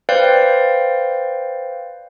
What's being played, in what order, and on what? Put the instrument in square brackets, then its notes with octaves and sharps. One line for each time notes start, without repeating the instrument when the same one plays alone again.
[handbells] B4 C5 D5 F5 G5